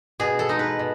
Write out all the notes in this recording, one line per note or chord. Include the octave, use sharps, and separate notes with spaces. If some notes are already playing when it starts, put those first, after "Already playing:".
B2 G#4
A4
G#3 D#4
B4
B2